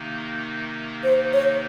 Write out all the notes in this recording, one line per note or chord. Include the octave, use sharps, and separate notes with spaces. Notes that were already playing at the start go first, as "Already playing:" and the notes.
Already playing: C3 D#3 A#3 D#4
C5
C#5